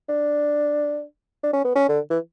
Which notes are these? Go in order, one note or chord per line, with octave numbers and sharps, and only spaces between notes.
D4
D4
C#4
B3
C#4
D3
E3